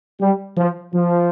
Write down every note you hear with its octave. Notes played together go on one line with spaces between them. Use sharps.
G3
F3
F3